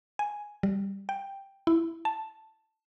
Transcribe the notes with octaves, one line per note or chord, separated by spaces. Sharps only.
G#5
G3
G5
E4
A5